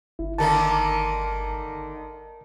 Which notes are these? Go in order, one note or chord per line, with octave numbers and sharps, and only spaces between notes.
G1 E4
D3 D#3 A#3 A#4 A5